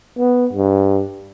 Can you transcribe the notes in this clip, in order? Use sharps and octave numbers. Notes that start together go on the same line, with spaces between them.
B3
G2